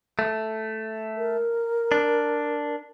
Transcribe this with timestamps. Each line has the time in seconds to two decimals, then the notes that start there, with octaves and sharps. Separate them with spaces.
0.19 A3
1.17 A#4
1.92 D4